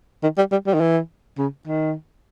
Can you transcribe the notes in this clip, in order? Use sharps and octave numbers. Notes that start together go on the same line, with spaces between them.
D#3
G3
G3
G3
D#3
E3
C#3
D#3